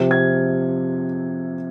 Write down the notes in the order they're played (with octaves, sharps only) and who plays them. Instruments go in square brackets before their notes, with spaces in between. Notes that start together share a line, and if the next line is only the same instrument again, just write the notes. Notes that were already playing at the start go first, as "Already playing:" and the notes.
Already playing: [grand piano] C3 F3
G#6